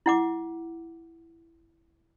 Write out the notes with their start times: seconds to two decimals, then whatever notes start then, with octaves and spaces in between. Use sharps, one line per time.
0.06 E4 F#5 D6